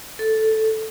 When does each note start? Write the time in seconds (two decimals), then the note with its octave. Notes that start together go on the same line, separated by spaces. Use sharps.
0.19 A4